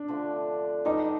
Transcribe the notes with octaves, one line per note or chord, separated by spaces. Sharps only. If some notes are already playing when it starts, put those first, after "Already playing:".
Already playing: D4
D3 F3 A3
D#3 G3 B3 D4 D#4